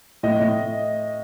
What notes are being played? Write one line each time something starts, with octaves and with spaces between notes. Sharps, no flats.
A2 D#5
A2